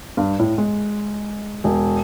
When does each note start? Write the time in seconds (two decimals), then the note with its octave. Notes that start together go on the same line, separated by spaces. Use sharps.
0.17 G2
0.39 A2
0.58 G#3
1.64 E1